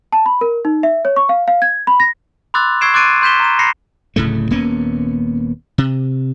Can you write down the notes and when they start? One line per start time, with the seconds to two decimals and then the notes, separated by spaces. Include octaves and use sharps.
0.12 A5
0.26 B5
0.41 A#4
0.65 D#4
0.83 E5
1.05 C#5
1.16 C#6
1.29 F5
1.48 F5
1.62 G#6
1.87 B5
2.00 A#6
2.54 B5 C6 D6 E6 F#6 A6
2.81 C#6 E6 G#6 C7 D7 E7
2.94 C6 D6 F#6 A6 D7 D#7
3.22 C6 G6 B6 E7 G7
3.40 A#5 E7
3.59 B5 A#6 C7 C#7
4.16 D1 A2 C#3 A3
4.51 D#1 A#3 B3 C#4
5.78 C3